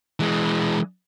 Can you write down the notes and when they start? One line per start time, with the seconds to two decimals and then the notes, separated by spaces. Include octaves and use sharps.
0.20 E3 G#3